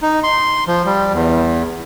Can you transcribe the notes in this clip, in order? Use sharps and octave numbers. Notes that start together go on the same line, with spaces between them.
D#4
C6
F3
G3
E2